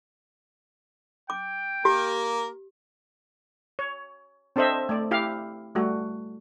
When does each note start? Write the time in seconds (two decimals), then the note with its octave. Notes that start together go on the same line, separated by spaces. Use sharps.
1.30 G5 D6
1.85 A#3 G4 A#4
3.79 C#5
4.56 C4 D4 A4 C5 D#5 E5
4.89 A3 D5
5.11 E4 G4 F5
5.75 G3 A3 F#4